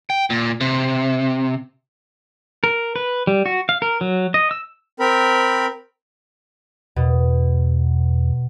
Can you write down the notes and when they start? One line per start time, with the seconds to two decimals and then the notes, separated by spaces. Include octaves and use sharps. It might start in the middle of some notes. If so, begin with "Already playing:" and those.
0.10 G5
0.30 A#2
0.61 C3
2.64 A#4
2.96 B4
3.27 G3
3.46 F#4
3.69 F5
3.82 A#4
4.01 F#3
4.34 D#5
4.51 E6
5.00 C4 A#4 B5
6.96 E2 B2